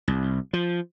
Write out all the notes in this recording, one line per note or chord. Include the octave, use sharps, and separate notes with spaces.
C2
F3